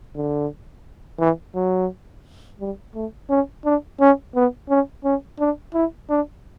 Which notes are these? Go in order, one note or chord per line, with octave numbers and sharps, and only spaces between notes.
D3
E3
F#3
G3
A3
C#4
D4
C#4
B3
C#4
C#4
D4
E4
D4